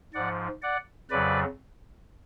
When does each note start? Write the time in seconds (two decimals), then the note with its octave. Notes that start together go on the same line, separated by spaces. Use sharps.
0.14 G#2 F3 D5 F#5
0.62 D5 F#5
1.10 F2 C#3 F#3 B4 D5